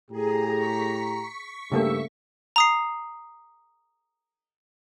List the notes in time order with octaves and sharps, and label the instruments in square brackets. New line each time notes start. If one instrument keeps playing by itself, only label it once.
[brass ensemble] A2 G4 A#5 [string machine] G#4
[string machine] C#6 B6
[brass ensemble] G2 G4 E5 [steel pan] C#3 A3 A#3
[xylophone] A#5 D#6 C7